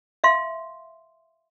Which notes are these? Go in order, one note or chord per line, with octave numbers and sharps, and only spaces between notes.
E5 F5 C6